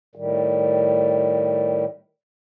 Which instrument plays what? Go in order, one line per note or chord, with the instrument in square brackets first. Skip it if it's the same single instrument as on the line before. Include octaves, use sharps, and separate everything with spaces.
[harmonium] A2 D#3 G3